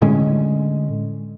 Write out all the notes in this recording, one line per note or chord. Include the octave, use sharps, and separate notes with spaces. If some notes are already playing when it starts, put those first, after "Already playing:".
A2 D3 G#3 C#4